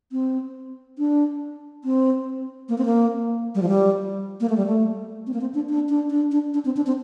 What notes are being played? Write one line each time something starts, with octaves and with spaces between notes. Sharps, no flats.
C4
D4
C4
A#3
C4
A#3
G3
F3
G3
A#3
A3
G3
A3
C4
A#3
C4
D4
D4
D4
D4
D4
D4
C4
D4
C4